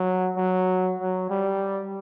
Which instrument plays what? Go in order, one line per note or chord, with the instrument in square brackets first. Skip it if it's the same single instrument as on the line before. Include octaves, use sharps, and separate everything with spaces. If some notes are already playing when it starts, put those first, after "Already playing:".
Already playing: [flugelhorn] F#3
F#3
F#3
G3